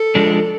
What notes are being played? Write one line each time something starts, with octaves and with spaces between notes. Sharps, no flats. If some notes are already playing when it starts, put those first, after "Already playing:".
Already playing: A4
F3 G#3 D4